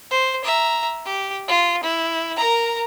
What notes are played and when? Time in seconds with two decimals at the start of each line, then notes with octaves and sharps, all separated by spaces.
0.11 C5
0.45 E5 A#5
1.06 G4
1.48 F4
1.83 E4
2.36 A#4 A#5